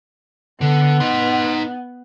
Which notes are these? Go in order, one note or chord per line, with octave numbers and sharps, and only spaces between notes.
D3 B3
D#4 C6